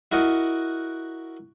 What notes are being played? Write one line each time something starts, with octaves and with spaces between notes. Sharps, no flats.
E4 F#4 A#4 D#5 F#5